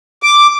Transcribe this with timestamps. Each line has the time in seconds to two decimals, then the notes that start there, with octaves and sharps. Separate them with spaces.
0.23 D6